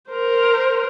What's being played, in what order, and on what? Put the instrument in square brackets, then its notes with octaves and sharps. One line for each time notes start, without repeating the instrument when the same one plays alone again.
[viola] A#4 C5